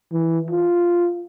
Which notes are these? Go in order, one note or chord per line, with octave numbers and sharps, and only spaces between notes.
E3
F4